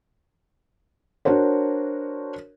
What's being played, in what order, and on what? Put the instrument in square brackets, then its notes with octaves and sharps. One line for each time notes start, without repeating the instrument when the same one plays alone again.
[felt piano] D4 F#4 A#4 C5 C#5